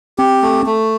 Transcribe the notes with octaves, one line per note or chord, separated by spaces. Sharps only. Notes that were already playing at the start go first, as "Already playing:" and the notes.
C4 G4
A3
A3